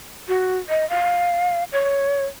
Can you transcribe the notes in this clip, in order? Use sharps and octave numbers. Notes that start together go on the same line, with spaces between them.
F#4
D#5
F5
C#5